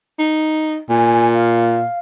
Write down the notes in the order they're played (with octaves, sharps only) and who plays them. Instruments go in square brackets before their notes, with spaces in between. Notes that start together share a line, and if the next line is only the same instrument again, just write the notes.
[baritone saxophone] D#4
[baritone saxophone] A#2 [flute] G#5
[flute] F5